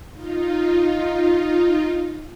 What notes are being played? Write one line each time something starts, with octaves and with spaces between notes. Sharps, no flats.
D#4 F4